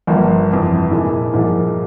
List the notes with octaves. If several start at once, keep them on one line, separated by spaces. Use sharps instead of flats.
G1 G2 F3 A#3
F2 C3 E3
A#2 G#3 E4 G#4
C2 A#2 F3 G#3